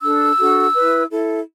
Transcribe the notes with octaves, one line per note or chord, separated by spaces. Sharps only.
D4 A4 E6
D4 F#4 A4
E4 B4
E4 A4